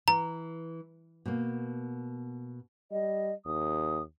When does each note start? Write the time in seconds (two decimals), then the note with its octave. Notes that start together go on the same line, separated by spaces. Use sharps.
0.08 E3 A#5
1.26 B2 A#3
2.92 G3 D#5
3.46 D#2 D#6